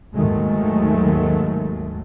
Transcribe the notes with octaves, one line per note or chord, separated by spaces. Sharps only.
D#2 G#2 D#3 F#3 G#3 A3